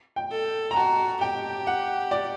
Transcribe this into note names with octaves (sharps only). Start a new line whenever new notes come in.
G5
A4
A#5
F#4 A5
G4 G5
F#5
D5